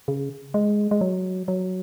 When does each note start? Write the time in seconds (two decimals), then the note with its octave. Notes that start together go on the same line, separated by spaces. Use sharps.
0.08 C#3
0.54 G#3
0.91 G#3
1.01 F#3
1.48 F#3